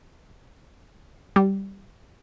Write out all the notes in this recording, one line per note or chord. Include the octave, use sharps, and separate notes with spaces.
G3